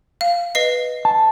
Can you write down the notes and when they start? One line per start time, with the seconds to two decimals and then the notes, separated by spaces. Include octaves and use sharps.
0.21 F5
0.55 B4 D#5 C7
1.05 A5